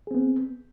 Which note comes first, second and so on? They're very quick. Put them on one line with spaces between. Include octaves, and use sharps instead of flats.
G#4 C4 B3